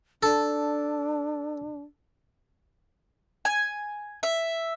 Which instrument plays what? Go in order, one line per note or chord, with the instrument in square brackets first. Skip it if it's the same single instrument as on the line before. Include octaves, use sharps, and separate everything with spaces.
[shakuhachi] D4 [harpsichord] A4
[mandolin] G#5
E5